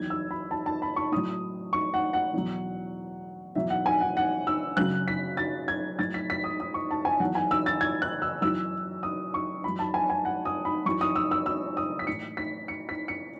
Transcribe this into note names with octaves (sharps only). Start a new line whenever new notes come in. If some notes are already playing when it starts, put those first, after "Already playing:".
Already playing: E2 D#3 F#3 G#6
E6
B5
A5
A5
B5
C#6
A2 F#3 D#6
C#6
F#5
F#5
E2 B2 F#3
E2 B2 F#3 E5
F#5
G#5
F#5
F#5
E6
F#2 C#3 F#3 F#6
B6
A6
G#6
A2 F#3 A6
B6
B6
D#6
D#6
C#6
A5
G#5
E2 D#3 F#3 F#5
G#5
E6
A6
G#6
F#6
E6
F#2 E3 E6
D#6
C#6
F#2 E3 B5
A5
G#5
G#5
F#5
D#6
B5
F#2 E3 C#6
D#6
E6
E6
E6
D#6
B6
A2 E3 C#7
B6
C#7
B6
C#7